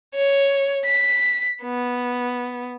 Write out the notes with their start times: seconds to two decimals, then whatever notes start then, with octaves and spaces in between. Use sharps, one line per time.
0.15 C#5
0.85 B6
1.63 B3